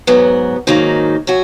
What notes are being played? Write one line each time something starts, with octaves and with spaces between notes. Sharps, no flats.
G#2 F#3 B3
G#2 D#3 F#3 A#3 D#4
F#3 C#4 F#4